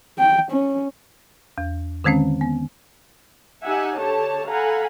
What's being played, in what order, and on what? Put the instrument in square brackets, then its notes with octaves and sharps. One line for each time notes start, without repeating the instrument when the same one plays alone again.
[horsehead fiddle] G5
C#4
[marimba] E2
D3 D#3 G#3 C4 C#4
B3
[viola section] D#4 G4 E5 F#5 G#5
D3 G4 A4 C#5 A5
A4 F5 F#5 G#5 A#5 B5